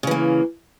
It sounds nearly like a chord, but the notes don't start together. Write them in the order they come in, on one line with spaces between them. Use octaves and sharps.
C#3 E3 A#3